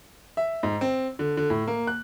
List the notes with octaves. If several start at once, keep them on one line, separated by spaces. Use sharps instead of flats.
E5
G#2
C4
D3
D3
A2
A#3
F#6